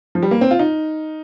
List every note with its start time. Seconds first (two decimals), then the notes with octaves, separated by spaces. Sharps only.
0.15 F3
0.23 G3
0.31 A#3
0.41 C4
0.51 F4
0.59 D#4